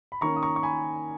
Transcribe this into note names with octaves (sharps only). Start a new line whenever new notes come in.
B5
D#3 A#3 C#4 A#5 C#6
D#6
A#5 C#6
C#6
G#5 B5